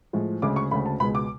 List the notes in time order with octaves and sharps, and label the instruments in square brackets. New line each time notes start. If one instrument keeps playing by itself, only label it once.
[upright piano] A2 F3 G#3
D2 C#3 G#3 D6
C#6
D2 C#3 G#3 B5
A5
C#2 B2 G#3 B5
D6